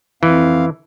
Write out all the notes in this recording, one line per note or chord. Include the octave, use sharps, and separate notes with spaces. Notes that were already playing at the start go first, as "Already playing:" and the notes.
F2 E3 F5